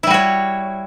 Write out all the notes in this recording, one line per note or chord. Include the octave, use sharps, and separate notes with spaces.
G3 E4 F#4 C#5